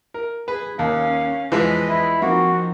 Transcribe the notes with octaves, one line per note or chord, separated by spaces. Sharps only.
A#4
G#4 B4
D#2 C#4 F5
E2 E3 F3 G#3 B4 D#5
E4
F3 A#3 C4 D#4 F#4